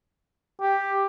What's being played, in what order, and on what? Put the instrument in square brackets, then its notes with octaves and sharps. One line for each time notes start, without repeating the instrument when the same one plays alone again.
[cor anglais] G4